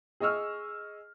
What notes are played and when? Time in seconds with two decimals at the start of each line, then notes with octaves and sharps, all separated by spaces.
0.20 G#4 D#5 C#6 E6 F6